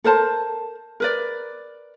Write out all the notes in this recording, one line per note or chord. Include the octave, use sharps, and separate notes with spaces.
A4 A#4 C5 A5
A#4 B4 D5